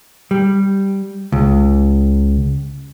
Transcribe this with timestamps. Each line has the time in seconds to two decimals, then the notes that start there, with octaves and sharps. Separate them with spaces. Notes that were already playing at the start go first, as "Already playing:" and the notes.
0.31 G3
1.32 C#2